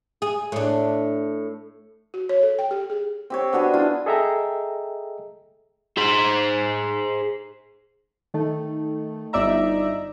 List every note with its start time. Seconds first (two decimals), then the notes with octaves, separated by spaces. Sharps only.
0.22 G#4
0.52 A2 D4
2.14 F#4
2.29 C#5
2.43 A4
2.59 G5
2.71 G4
2.90 G#4
3.30 C4 G4 C#5
3.53 B3 D4 F#4 G#4
3.74 D4 E4 F4
4.06 G#4 A4 D#5 E5 G5 A#5
5.97 G#4 C5
8.34 D#3 A3
9.33 G1 D#4 D5 E5 A#5